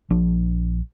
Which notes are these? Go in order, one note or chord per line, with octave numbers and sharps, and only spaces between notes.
A#1 F3 D4